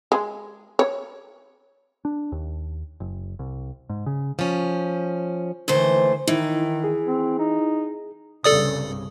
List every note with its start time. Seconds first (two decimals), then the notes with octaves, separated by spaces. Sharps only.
0.12 G#3
0.79 C#5
2.05 D4
2.32 D#2
3.00 F#1
3.39 C2
3.89 G#2
4.06 C#3
4.39 F3 C#4
5.68 D#2 D3 E3 A3 C5
6.27 D#3 E3 D#4 E4
6.84 G#4
7.07 C4
7.39 D#4
8.44 C2 G2 C#3 A4 D5 D#6